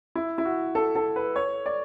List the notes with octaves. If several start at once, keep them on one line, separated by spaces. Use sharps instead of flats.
E4
E4
F#4
A4
A4
B4
C#5
D5